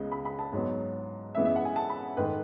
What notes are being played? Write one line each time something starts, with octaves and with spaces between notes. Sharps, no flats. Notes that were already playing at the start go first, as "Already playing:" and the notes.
Already playing: C#2 C#3 G#3 B3
B5
B5
A5
G#2 F#3 B3
F#2 E3 G#3 B3 E5
E5
F#5
G#5
A5
B5
G#2 D#3 A3 B4